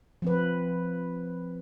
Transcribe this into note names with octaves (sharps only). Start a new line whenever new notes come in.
F3 C4 B4